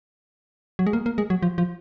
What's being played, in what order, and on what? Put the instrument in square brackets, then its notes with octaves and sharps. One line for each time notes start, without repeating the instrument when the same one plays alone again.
[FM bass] F#3
G#3
A#3
A#3
G#3
F#3
F3
F3